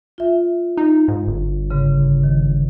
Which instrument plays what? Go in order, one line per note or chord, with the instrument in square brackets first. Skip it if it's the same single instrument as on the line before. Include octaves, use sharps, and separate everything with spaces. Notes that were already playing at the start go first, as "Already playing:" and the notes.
[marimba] F4 E5
[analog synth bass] D#4
G#2
G1
[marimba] G#2 C#3
D#3